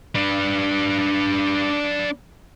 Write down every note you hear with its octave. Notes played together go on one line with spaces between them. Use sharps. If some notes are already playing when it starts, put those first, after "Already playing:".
D4 B4